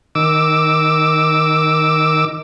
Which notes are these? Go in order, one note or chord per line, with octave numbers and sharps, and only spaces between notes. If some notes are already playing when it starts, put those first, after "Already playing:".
D#3 D6 E6